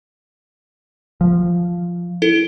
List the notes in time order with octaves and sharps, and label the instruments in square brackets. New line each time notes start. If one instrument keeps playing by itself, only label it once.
[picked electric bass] F3
[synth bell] E4 A4